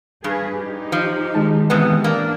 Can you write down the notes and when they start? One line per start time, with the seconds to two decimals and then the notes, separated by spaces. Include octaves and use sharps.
0.24 G2 G#4 B4
0.59 D#4 G4
0.92 F3
1.35 D#3 G#3 A5
1.70 G#2 C3 E3 B3
2.04 A#3 D4